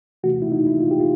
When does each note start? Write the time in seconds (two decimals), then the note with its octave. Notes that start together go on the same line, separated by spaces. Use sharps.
0.23 C3 E3 A3 F#4
0.42 E4
0.52 D#4
0.67 E4
0.81 F4
0.91 G4
1.00 F4